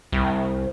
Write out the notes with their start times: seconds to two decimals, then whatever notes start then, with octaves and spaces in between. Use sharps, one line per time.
0.12 C2